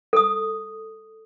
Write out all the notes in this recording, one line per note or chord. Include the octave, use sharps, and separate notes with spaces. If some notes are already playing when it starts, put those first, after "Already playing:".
A4 D#6